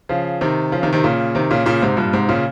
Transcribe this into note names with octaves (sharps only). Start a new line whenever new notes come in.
C#3 F3
C3 D#3
C#3 F3
C3 D#3
C3 D#3
A#2 C#3
C3 D#3
A#2 C#3
A#2 C#3
G#2 C3
G2 A#2
G#2 C3
A#2 C#3